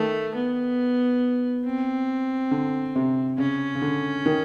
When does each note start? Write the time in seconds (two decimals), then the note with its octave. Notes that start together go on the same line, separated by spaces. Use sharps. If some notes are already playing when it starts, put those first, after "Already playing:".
Already playing: D#3 A3
0.35 B3
1.65 C4
2.51 D3
2.96 C3
3.38 C#3 C#4
3.75 C#3
3.82 D3
4.26 D#3